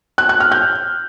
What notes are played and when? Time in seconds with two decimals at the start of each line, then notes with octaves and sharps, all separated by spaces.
0.18 F#6
0.29 F#6
0.40 F6
0.52 G6